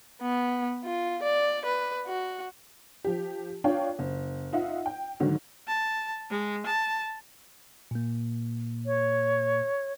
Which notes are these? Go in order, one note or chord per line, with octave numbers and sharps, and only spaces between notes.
B3
F4
D5
B4
F#4
F3 G4
D4 F4 C#5 G5
F#1
D#4 F4 E5 F#5
G5
G#2 D3 D#3 F#3
A5
G#3
A5
A#2 A#3
C#5